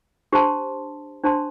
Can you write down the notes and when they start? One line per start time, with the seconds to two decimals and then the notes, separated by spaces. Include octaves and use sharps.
0.32 D4 G4 C5 A5 C6
1.24 D4 G4 C5 A5 C6